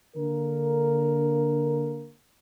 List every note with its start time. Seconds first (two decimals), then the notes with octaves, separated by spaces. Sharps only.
0.16 D3 A#3 A#4